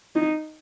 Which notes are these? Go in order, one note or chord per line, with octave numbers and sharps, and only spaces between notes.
D#4